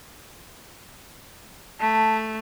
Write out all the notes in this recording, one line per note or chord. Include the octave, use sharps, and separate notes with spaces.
A3 A5